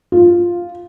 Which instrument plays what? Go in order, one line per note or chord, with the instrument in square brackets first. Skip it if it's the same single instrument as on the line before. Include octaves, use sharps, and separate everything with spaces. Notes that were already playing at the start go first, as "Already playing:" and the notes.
[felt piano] F4